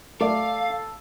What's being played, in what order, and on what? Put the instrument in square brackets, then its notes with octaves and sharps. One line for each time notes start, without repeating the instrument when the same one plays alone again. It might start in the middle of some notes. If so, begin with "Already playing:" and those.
[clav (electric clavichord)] A3 [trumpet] A4 [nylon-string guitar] D5 [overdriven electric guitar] F5